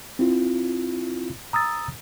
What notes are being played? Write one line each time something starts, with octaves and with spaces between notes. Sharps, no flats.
C4 E4 F4
A#5 D#6 E6 A6